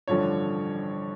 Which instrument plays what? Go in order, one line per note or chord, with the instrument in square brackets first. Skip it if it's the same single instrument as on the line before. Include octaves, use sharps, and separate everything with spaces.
[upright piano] A1 G2 D3 F3 C#5